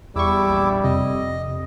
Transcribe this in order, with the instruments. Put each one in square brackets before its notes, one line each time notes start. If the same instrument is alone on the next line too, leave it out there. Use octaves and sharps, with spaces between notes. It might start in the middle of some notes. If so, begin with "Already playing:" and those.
[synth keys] E2 C#6 [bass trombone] G3 [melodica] E4 D6 E6
[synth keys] A#1
[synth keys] F2 [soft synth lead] C3 [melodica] D#5